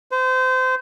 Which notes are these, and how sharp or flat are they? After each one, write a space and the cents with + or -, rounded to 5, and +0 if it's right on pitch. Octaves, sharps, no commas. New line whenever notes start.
C5 -30